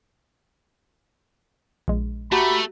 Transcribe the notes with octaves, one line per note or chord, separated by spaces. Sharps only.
A#1 G#3
A3 F#4 G4 A#5 B5